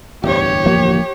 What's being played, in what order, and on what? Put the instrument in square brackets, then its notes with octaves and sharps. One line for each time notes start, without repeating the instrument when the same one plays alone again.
[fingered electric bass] D1 E2 G2 [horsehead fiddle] G4 C#5
[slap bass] F3 A#3